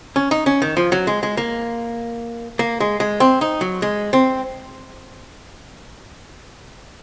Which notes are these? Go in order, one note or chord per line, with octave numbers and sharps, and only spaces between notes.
C#4
D#4
C#4
D#3
F3
F#3
G#3
G#3
A#3
A#3
G#3
G#3
C4
D#4
F#3
G#3
C4